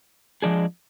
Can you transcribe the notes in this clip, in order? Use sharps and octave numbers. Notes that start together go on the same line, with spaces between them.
F3 G#3 D4 G#4